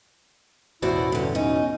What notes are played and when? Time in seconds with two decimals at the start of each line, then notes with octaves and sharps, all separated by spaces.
0.82 A1 E2 B2 E4 F#4 C5 D5
1.12 G2 D3 C#4
1.35 C#4 D#4